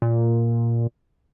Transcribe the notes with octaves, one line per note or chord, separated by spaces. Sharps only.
A#2